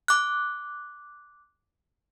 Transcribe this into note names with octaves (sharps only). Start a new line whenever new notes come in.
D6 F#6